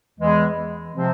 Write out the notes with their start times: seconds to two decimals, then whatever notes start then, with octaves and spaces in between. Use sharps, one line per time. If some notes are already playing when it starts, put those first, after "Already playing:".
0.18 E2 E3 G#3
0.94 C3 F3 C4